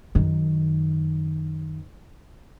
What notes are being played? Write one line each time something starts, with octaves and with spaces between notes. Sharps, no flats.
F#2 D#3